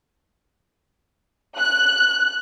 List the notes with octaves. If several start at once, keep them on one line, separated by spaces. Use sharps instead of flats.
F#6